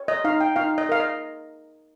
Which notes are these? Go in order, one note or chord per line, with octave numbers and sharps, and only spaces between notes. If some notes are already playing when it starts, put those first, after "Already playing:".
Already playing: C#5
D#5
D#4 F5
G5
D#4 F5
D#5
A#4 F5
D#5